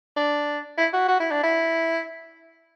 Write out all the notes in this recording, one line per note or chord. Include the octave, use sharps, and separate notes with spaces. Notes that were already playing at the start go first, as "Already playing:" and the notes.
D4
E4
F#4
F#4
E4
D4
E4